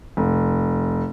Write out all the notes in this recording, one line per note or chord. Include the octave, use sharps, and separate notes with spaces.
F1